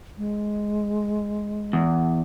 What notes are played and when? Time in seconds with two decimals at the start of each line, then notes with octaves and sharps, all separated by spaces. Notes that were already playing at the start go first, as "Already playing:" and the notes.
0.18 G#3
1.73 E2